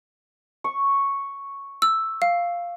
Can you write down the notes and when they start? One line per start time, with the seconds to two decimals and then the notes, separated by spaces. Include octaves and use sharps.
0.64 C#6
1.82 E6
2.22 F5